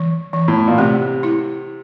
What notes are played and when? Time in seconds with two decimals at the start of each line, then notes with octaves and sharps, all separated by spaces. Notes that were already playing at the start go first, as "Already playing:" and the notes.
Already playing: E3
0.33 E3
0.48 A2
0.68 A#2
0.78 C3 A3
1.23 E4